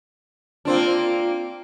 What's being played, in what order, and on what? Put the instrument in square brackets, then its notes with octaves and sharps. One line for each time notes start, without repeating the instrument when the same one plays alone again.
[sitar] A#3 C4 D4 [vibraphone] F4